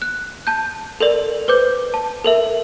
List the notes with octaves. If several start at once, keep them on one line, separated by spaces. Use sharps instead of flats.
F#6
A5 G6
A4 A#4 D5
B4 C5 D6 G6
A5
A4 A#4 E5